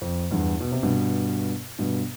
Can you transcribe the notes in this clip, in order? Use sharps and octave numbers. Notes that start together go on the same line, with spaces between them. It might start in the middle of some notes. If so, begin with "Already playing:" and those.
F2
E2 G2
B2
C3
G2 B2
G2 B2